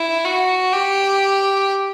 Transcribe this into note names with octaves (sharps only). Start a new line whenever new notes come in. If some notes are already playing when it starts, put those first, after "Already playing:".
Already playing: E4
F#4
G4